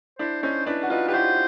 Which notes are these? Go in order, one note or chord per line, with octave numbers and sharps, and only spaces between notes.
D4 E4 C5
C#4 D#4 C5
D4 E4 B4
F#4
D#4 F4 B4
G4 B4
E4 F#4 C5